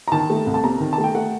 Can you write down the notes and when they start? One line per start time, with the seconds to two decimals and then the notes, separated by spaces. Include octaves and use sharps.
0.08 A#5
0.12 D#3 A5
0.30 A3
0.46 C2
0.54 A5
0.63 C3 A#5
0.80 D#3
0.93 A5
0.98 A3
1.04 G5
1.15 A3 F#5